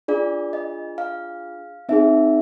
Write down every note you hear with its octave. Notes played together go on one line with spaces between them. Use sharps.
D4 F4 G#4 D5
D#5
F5
C4 D#4 G#4 E5